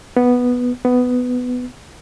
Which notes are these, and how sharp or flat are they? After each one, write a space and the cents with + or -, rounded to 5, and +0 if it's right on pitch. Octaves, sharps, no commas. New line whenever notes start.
B3 -5
B3 +10